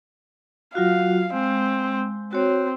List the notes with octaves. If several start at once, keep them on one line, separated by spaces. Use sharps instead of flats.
F#3 F4 F#4 F5
G#3 C4
C4 F#4 C#5